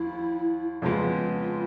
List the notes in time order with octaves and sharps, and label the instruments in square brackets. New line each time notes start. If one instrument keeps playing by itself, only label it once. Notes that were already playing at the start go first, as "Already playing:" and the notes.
Already playing: [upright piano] D#2 F3 [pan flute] E4
[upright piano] F2 C#3 F3 G#3 B3 [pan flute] F4